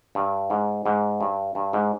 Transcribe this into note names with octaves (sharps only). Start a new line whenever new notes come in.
G2
G#2
G#2
G2
G2
G#2